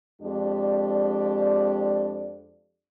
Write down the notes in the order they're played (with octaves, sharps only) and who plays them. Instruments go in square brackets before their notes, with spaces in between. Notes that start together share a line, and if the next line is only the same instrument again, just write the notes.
[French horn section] F2 G#3 D4 G4 D5